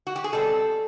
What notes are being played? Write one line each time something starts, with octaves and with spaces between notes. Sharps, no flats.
F#4
G4
G#4
B2 G3 C4 A4